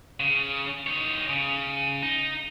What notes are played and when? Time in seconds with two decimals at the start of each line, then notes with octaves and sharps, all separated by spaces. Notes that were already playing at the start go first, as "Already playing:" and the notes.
0.20 C#3
0.87 D#4 C#5
1.29 C#3
2.03 D#4